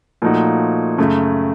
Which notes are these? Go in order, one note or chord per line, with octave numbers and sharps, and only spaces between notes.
A#2 F3 A3 D#4 F#4
F#2 C#3 A3